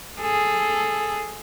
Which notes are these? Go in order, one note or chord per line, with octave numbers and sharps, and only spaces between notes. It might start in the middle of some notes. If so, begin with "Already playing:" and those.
G#4 A4